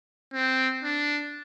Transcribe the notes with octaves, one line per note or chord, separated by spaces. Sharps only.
C4
D4